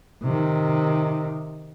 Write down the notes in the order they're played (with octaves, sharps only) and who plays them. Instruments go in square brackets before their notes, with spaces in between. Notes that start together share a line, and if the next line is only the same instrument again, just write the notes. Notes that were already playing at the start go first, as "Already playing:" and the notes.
[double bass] C3 D#3